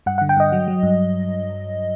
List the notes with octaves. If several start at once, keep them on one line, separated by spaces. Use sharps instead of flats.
G2 F#5
D3 F#5
G5
G2 D#5
F#3
F#3
G2